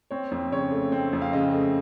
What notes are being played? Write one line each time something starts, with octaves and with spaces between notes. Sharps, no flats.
C4 C#5
F2
C#3 C#5
A3
C4
F2
F5
C#3 D#5
A3